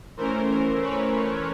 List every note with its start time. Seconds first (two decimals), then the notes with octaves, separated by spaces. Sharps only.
0.17 E3 A3 C#4 A#4 C5
0.49 A#4 C5
0.81 B4 C#5